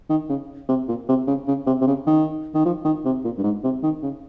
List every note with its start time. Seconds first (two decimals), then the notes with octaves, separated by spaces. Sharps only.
0.10 D#3
0.29 C#3
0.69 C3
0.88 A#2
1.08 C3
1.27 C#3
1.47 C#3
1.67 C3
1.81 C3
1.87 C#3
2.07 D#3
2.54 D#3
2.65 F3
2.85 D#3
3.05 C3
3.24 A#2
3.38 G2
3.43 G#2
3.63 C3
3.83 D#3
4.03 C#3